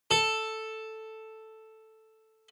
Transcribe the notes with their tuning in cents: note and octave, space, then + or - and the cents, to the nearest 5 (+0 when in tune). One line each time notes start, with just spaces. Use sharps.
A4 +0